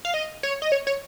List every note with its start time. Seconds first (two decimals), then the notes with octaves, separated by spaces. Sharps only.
0.05 F5
0.14 D#5
0.43 C#5
0.62 D#5
0.72 C#5
0.87 C#5